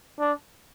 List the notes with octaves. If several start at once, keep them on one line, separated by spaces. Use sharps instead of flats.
D4